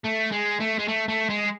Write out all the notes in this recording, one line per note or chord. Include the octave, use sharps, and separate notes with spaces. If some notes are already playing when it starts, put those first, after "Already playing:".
A3
G#3
A3
G#3
A3
A3
G#3